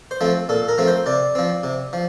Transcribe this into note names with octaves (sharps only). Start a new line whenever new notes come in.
C5
F3 A3 C4
A#2 A4
A#4
F3 A3 C4
C5
C3 D5
F3 C4
C3
F3